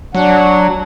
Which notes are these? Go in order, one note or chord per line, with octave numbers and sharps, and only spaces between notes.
F#3 D4 F#5